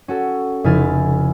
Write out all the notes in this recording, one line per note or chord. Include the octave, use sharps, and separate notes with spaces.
C#4 F#4 A4
F1 C#3 E4 G#5 F6 A6